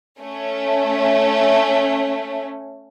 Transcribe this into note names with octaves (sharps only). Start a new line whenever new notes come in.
A3 C#4